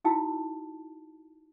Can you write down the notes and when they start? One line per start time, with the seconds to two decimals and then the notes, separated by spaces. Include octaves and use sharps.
0.05 D#4 E4 F#4 G5 A5 E6